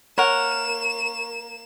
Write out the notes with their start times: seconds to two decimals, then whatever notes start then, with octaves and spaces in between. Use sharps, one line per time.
0.18 A#3 A#4 C#5 F#5 E7